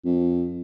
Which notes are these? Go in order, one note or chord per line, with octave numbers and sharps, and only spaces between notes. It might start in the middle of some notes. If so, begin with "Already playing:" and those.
F2